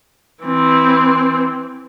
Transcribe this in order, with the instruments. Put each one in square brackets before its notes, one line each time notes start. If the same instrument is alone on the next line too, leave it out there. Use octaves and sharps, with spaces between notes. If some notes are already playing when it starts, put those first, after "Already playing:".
[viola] E3 C4